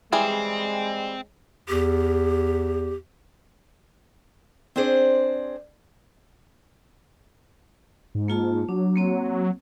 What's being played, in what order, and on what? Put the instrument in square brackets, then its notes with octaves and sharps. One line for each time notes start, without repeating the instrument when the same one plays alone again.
[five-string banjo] E3 G3 G#4 [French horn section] G#3 [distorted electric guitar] C4
[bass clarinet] E2 [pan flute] G4
[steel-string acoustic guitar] C4 D4 G#4 C5 D5
[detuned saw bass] G#2
[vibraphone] A#3 F4 A5
[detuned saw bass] F#3 [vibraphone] D4
[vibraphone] A#3 C4 C#5